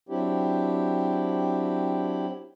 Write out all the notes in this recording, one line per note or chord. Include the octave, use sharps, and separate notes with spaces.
F#3 C4 D4 E4 G4